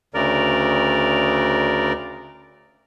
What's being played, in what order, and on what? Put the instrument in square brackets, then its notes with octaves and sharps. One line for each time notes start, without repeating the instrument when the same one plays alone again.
[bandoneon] D2 C#3 A#4 D5